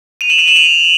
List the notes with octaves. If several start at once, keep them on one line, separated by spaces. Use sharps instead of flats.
D#7 F7
E7 F#7
D#7 F7
E7 F#7
D#7 F7